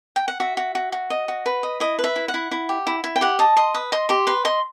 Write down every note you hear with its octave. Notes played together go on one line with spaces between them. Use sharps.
G5
F#5
F#4 E5
F#4
F#4
F#4
D#5
F#4
B4
D#5
E4 D#5
B4
E5
E4
F#5
E4
E4
G4
E4
E4
G5
G4 F#5
D#5 A5
D#5 C6
B4 D#6
D#5 C6
G4 C6
B4 C6
D#5 C6